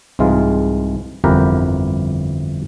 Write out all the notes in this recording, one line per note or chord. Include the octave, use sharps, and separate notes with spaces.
C2 G#2 E3 G#3 F4
G1 F2 E3 G4 A#4 B4